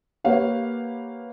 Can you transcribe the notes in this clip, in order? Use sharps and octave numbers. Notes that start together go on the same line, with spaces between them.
A#3 G4 B4 C#5 F5 F#5